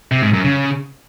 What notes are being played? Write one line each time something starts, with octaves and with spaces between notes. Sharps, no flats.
C3
G#2
F#2
C#3